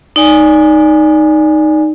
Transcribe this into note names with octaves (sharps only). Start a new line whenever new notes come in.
D#4 D5 G#5